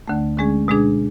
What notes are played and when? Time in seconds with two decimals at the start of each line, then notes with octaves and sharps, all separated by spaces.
0.08 D2 D3 A3
0.38 D3 G#3 C#4 G#4
0.68 B2 G#3 D4 G#4